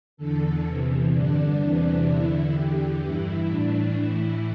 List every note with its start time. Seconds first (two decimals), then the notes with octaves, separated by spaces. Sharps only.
0.17 E2 D3 A4
0.64 E2 C3 E3
1.11 G2 D3 D4
1.58 E2 C3 E3
2.05 E2 D3 E4
2.52 E2 D3 G4
2.99 G2 E3 E4
3.46 A2 E3 D4
3.94 A2 E3 E4